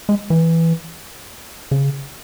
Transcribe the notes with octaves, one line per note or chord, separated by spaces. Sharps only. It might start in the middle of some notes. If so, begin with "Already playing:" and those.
G#3
E3
C#3